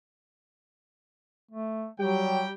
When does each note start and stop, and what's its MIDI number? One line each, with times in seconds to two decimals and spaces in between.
1.51 1.87 57
2.00 2.44 54
2.00 2.52 55
2.00 2.52 67
2.00 2.52 79